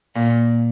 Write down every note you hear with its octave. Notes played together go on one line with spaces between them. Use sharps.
A#2